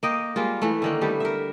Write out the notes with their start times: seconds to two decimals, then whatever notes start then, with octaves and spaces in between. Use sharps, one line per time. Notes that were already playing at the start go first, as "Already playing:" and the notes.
0.03 A#3 D#5 G5
0.36 G3 G#3 A#3 F4
0.62 E3 A3
0.82 D3 D#3 A#3
1.01 G3 A3 B3 G4
1.20 A#4 E5